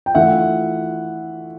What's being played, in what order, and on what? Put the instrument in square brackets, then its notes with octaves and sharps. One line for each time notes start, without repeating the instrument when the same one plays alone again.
[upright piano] G5
E3 A3 D4 F4 E5 F#5